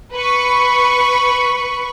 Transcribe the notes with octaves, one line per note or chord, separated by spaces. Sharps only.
B4 B5 C#6